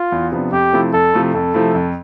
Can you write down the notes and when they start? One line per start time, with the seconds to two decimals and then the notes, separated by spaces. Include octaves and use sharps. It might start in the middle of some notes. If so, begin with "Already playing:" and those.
Already playing: F4
0.12 E2
0.32 C3 F3 B3 D4
0.52 F2 G4
0.73 C3 F3 A3 E4
0.93 F2 A4
1.14 C3 F3 A3 E4
1.34 F2 A4
1.54 C3 F3 A3 E4
1.74 F2